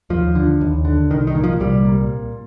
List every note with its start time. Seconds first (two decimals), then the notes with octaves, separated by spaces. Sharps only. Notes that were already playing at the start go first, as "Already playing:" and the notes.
0.10 D#2 F3
0.35 D3
0.61 D#2
0.85 D3
1.10 C2 D#3
1.27 D#3
1.35 A#2
1.44 F3
1.60 C2 G3
1.85 A#2